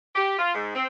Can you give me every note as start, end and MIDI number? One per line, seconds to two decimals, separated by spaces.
0.15 0.38 67
0.39 0.54 65
0.55 0.71 44
0.75 0.86 60